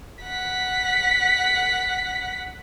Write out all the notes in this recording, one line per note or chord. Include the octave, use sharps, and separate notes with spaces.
F#5 B6